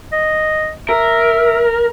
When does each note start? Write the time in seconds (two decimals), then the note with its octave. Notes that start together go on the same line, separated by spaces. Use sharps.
0.12 D#5
0.89 A#4 E5